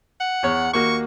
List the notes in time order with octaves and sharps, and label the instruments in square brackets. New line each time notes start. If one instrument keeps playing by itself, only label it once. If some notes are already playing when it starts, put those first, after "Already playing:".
[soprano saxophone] F#5
[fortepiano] E2 C#5
[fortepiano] D#2 A#3 F#4 [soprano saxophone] C#6